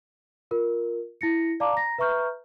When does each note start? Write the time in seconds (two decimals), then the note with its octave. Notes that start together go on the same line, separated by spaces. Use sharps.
0.51 F4 A#4
1.21 E4 A#6 C#7
1.60 D5 F5 A5 A#5 D6
1.73 A#5 A#6
1.98 B4 E5 A#5 C#6 F6 G6